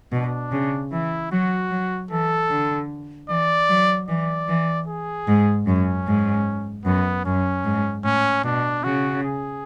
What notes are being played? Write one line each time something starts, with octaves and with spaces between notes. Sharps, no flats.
B2 D4
C#3
E3 E4
F#3 F#4
F#3
E3 A4
D3
E3 D5
F#3
E3 D5
E3
G#4
G#2
F#2 C#4
G#2
F#2 B3
F#2 C#4
G#2
A2 C#4
B2 D4
C#3 F#4
G#4